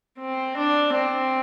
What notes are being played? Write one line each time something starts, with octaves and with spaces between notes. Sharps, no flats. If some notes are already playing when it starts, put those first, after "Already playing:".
C4
D4
C4